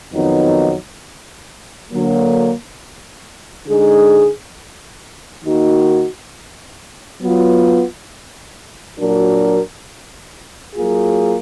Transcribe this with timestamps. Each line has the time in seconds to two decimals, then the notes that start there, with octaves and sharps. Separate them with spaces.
0.12 F2 D#3 F#3 B3 D#4
1.90 D3 F#3 A#3
3.66 D3 G#3 D#4 G#4
5.44 D#3 A#3 D#4 F#4
7.22 F#3 B3 F4
8.99 A#2 F#3 D4 F#4 A#4
10.75 F#3 A#3 F4 G#4